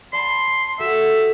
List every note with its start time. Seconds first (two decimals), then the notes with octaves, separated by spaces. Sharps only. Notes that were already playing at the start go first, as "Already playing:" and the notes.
0.13 D5 A5 B5 C6
0.80 F#4 G4 A4 E5